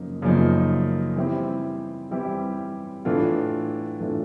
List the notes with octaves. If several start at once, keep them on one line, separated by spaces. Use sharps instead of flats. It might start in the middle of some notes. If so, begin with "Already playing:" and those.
Already playing: F#2 C#3 F3 A#3 D#4
F#2 C#3 F3 A#3 D#4
E3 G3 C4 E4 G4
E3 G3 C4 E4 G4
A2 E3 A3 D4 F4
A2 E3 A3 D4 F4